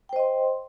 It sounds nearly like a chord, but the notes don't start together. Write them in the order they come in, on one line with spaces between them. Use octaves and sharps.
G5 C5 D#5 C6